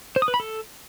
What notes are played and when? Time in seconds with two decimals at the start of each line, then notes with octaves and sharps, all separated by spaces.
0.16 C5
0.22 D#6
0.28 B4
0.34 B5
0.40 A4